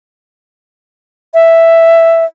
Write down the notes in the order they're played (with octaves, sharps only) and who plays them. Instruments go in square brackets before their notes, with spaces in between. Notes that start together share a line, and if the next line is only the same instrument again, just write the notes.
[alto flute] E5